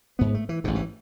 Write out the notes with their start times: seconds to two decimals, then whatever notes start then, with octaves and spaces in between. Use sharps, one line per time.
0.19 G#1 G#2 B3
0.34 A3
0.49 E3
0.64 A1 G#2 D3
0.75 E3